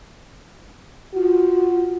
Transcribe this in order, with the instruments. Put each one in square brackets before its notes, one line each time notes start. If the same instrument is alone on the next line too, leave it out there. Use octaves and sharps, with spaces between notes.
[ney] F4 [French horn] F#4